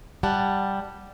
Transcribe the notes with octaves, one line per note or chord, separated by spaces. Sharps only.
G3 F#5 A5